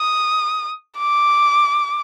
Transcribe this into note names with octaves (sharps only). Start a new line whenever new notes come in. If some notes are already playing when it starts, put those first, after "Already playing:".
Already playing: D#6
D6